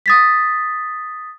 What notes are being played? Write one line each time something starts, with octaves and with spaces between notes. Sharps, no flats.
D#6 A6 B6